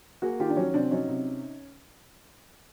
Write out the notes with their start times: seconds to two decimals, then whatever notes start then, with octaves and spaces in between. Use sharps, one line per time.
0.22 A#3 F#4 G#4
0.40 D#3 F4 G4
0.49 D4
0.57 F#3 C#4
0.74 C3 C4 D4
0.91 F#3 C#4 D#4
1.09 C3